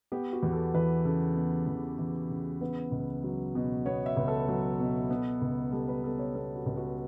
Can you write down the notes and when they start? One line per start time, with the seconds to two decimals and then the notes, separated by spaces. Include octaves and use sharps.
0.12 B3 G4
0.33 F#4
0.43 E2
0.53 A4
0.74 E3 B4
1.05 C#3 A4
1.37 B3
1.67 E2
1.99 E3
2.30 C#3
2.61 B3 B4
2.92 C#2
3.24 F#3
3.55 B2
3.86 B3 C#5
4.06 E5
4.17 C#2
4.28 A4
4.48 F#3
4.79 B2
5.10 B3
5.42 C#2
5.72 G3 A4
5.88 B4
6.04 B2 A4
6.19 C#5
6.35 B3 A4
6.56 F#4
6.66 C#2
6.77 F#4